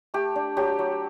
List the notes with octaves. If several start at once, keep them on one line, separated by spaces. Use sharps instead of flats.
A3 G4
D4
F#3 G4
F#3